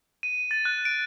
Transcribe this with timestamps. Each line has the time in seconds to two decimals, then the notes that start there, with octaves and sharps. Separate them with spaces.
0.23 D#7
0.51 A6
0.65 F#6
0.85 D7